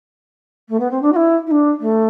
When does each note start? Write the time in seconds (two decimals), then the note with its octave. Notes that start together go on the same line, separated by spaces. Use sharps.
0.68 A3
0.79 B3
0.90 C4
1.01 D4
1.12 F#4
1.15 E4
1.46 E4
1.50 D4
1.79 A3